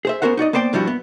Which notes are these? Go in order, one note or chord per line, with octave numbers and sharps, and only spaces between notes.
G#4 C5 E5
B3 C#4 F#4 A#4 C5 F#5
D#4 F#4 D5 D#5
A#3 B3 C5 D5 G5
G2 F3 G3 E4 F#4
B3